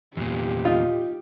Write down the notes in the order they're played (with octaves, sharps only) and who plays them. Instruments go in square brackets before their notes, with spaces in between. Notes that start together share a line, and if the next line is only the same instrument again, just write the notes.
[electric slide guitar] E2 A#2 [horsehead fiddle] G4
[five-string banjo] D#4 F4